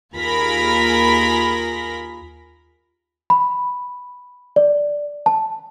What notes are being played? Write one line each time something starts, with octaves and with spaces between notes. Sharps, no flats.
D#2 F4 G#4 A#4 B5 A#6
B5
D5
A5